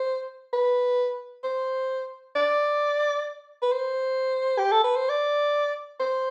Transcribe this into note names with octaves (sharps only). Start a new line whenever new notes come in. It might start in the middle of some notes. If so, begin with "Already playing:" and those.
Already playing: C5
B4
C5
D5
B4
C5
G4
A4
B4
C5
D5
C5